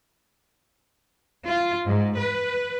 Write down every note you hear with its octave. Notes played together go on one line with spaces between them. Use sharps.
F4
G#2
B4